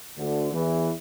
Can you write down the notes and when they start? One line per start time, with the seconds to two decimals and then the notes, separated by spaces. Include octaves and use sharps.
0.17 D2 D3
0.53 E2 E3